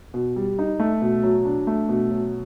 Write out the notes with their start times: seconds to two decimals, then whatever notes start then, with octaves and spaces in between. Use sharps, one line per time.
0.14 B2
0.36 G3
0.59 D#4
0.80 A3
1.02 B2
1.23 F#3
1.45 D4
1.67 A3
1.89 B2
2.11 F#3